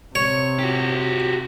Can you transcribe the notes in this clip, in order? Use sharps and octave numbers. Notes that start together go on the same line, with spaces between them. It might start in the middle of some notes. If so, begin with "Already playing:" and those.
C3 C#5
F#4 G4